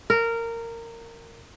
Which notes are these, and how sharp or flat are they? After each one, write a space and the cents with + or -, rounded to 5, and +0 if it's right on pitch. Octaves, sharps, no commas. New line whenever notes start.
A#4 -15